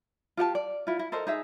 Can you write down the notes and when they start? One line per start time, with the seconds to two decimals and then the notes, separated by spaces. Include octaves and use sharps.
0.37 F4 G4 F#5 A5
0.55 D5
0.87 E4 F4
0.99 E4
1.12 A4 A#4 C5 D#5
1.27 D#4 G#4 E5